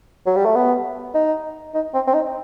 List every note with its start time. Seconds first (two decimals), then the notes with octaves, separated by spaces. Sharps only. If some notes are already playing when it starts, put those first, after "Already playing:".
0.27 F#3
0.37 G3
0.46 A3
0.55 B3
1.15 D#4
1.75 D#4
1.94 C4
2.08 C4
2.14 D#4